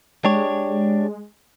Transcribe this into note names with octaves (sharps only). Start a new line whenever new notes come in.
G#3 D4 G4 C#5